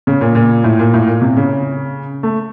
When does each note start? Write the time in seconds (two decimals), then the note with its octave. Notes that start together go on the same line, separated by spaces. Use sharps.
0.07 C#3
0.21 A#2
0.35 A#2
0.64 A2
0.79 A#2
0.94 A2
1.08 A#2
1.22 C3
1.37 C#3
2.23 A3